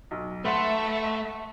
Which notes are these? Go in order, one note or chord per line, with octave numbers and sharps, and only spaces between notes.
B1
A3 B4 E5 F#5 A5 C6